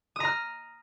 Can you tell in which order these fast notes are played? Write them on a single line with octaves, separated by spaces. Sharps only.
D#6 A#5 F6